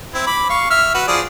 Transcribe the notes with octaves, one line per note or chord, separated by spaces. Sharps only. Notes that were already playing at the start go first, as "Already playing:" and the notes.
C4 E4
B5 D6
F5 C#6
E5 F6
F#4 B4
F3 G#4 D5